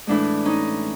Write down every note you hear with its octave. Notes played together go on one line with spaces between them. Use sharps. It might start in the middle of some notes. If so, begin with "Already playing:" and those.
A2 E3 G#3 D4 E4
C#4 D#4